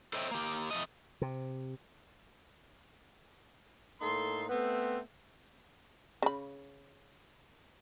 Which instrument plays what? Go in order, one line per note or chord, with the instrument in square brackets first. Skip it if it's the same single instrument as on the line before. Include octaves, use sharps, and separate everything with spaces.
[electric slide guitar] A4 C5 C#5 D#5 E5 G5
A#3 G4
F2 A3 D#5
[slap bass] C3
[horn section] A2 A#3 D#4 A4 C6
A3 B3 C4
[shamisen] C#3 B5